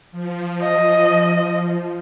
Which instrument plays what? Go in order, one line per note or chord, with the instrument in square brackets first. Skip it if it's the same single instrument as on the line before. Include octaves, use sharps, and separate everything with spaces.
[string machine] F3
[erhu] D#5